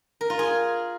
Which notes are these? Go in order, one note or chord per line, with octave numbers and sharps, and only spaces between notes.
A#4
F4
G#4